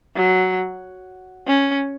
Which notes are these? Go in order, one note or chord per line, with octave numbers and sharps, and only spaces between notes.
F#3
C#4